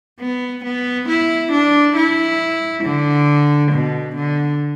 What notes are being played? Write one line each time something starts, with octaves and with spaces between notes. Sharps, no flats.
B3
B3
E4
D4
E4
D3
B2
D3